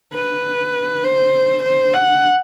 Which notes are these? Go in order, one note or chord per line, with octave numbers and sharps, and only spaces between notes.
B4
C5
C5
F#5